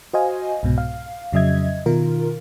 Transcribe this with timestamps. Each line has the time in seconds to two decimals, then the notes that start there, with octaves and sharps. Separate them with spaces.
0.13 F#4 C5 D#5 F5 G#5
0.63 C2 G#2 B2
0.78 F5
1.33 F2 C#3 F#3 D#5 E5 G#6
1.86 B2 D#3 F4 A#4